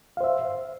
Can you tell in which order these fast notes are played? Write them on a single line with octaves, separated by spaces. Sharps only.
F5 C5 E5